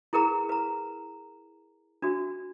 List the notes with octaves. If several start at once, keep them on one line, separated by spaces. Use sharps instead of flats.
E4 G#4 A#4 B4 A#5
B4 A#5
D4 F#4